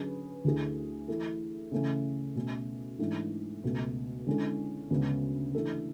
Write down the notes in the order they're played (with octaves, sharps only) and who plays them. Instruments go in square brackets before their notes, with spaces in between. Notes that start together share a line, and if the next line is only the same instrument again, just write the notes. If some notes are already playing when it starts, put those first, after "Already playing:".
Already playing: [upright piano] D3 F#3 C#4 G#4 B4
D2 D3 A3 E4 G#4
E3 A3 E4 A4
C#3 E3 A3 C#4
B2 A3 C#4
G#2 E3 A3 D4
C#2 B2 A3
D3 G#3 C#4 E4 A4
D2 C#3 G#3 B3
E3 A3 D4 A4